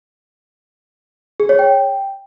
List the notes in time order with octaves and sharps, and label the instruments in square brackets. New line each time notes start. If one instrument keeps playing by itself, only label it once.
[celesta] G#4
C#5
G5